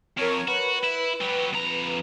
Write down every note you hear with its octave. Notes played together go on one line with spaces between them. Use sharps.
F2 A#4 C#5
F#4 B4
E4
F#3 G4
F2 A#5